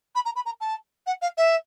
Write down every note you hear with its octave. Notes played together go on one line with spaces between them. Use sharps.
B5
A#5
B5
A#5
A5
F#5
F5
E5